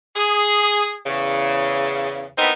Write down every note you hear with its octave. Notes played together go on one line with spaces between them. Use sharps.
G#4
E2 C#3
B3 C4 D#4 E4 A#4